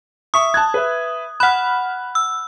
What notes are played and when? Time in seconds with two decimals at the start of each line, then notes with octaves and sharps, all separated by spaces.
0.34 E5 C#6 D#6
0.54 A5 F#6 G#6
0.74 B4 E5
1.40 F#5 B5 F6 F#6
2.15 E6